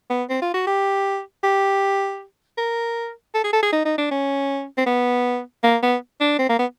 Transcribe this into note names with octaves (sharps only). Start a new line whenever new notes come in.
B3
C4
F4
F#4
G4
G4
A#4
A4
G#4
A4
G#4
D#4
D#4
D4
C#4
C4
B3
A#3
B3
D4
C4
A#3
B3